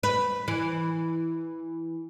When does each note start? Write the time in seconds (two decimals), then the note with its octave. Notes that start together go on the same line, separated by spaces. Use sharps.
0.03 B4
0.48 E3